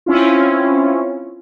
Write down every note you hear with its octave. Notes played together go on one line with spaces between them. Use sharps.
C4 C#4 E4 F4